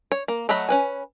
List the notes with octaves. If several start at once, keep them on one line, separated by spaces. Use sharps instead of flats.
C#5
A#3
F#3 A3 D#5 F#5 B5
C#4 B4 G#5